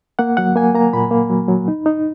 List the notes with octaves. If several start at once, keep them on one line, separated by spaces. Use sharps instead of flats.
A#3 F#5
F#3 F#5
A#3 G#5
A#3 A#5
A#2 B5
A#3
F#3
F#3
D#4
D#4